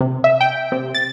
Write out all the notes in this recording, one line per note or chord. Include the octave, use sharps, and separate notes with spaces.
C3
E5
G5
C3
A6